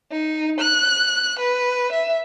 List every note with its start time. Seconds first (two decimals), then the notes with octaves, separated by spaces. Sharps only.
0.11 D#4
0.59 F#6
1.38 B4
1.92 E5